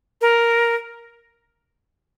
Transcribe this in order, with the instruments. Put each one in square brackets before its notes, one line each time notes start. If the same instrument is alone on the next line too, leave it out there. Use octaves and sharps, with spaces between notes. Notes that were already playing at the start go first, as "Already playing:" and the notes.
[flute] A#4